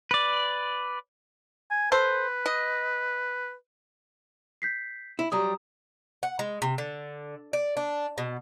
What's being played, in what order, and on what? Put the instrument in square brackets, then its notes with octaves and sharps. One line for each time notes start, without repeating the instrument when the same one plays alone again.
[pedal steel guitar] B4 D5
[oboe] G#5
[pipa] A4 C5 [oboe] B4
[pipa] D#5
[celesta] G6 B6 C7
[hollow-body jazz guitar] E4
[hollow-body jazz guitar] F#3 G3 [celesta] G4 A#5 D#6
[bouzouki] F#5
G#3
C3
D3
D5
D4
B2